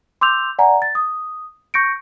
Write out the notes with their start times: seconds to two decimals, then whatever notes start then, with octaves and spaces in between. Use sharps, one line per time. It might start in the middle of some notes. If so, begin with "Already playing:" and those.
0.21 C6 D6 E6 G6 F7
0.59 D5 F#5 G#5 A#5
0.82 A6
0.95 D#6
1.74 C#6 G6 A#6 C#7 D7